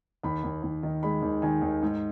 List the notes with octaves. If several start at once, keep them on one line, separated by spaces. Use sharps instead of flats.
D#2 B5
D#2
D#2
D#3
G#3 B5
D#2
D#3 G#5
D#2
G#2